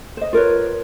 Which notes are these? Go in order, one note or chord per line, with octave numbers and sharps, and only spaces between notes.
C5 D#5
F4 A#4 B4 C#5